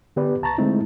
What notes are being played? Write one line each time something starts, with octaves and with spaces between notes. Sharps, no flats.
D3 B3 G4 B4 D5
C#2 A5 A#5 C#6 A6
D3 G#3 A3 C4 D#4 E4